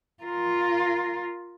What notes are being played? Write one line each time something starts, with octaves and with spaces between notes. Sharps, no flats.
F4 A#4